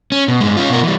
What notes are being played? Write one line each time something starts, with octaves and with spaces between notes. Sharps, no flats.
C#4
B2
G2 G#3
C#4 F4
B2 A#4
E3 G3